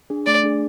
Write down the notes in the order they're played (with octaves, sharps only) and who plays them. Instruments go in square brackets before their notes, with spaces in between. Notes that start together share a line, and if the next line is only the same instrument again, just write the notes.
[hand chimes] D4 G#4
[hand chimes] A3 [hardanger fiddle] D5
[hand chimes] D4 G#4